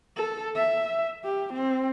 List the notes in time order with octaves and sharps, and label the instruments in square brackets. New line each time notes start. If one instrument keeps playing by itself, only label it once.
[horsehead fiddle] A4
E5
G4
C4